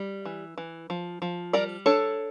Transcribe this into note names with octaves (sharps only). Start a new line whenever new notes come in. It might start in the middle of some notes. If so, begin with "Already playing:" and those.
Already playing: G3
E3
E3
F3
F3
G3 A#4 D5
D4 A4 C#5